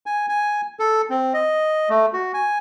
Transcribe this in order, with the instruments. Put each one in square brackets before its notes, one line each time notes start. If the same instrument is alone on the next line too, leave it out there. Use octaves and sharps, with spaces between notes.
[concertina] G#5
G#5
A4
C4
D#5
A3
F#4
G#5